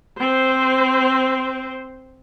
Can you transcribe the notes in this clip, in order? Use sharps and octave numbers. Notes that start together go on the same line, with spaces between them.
C4 C5